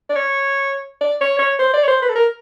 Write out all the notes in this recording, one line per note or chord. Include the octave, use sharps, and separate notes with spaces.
D5
C#5
D5
C#5
C#5
C5
D5
C#5
C5
B4
A4
A#4